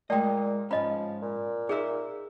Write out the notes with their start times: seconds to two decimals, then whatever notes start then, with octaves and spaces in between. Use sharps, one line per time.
0.10 A#2 G#3 A3 D5 D#5 G5
0.71 G#2 F3 C#4 D#5 B5
1.22 A#2
1.69 D#4 G#4 A#4 E5 E6